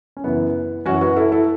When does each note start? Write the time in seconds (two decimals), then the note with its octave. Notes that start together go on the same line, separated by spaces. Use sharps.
0.17 C#4
0.24 F#2 C#3 E3 B3 E4
0.86 F#2 E3 C#4 F#4
1.01 F#4 B4
1.16 E4 A4
1.32 E4 A4